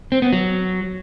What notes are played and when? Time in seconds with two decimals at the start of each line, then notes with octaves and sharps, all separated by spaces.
0.12 C4
0.22 B3
0.33 F#3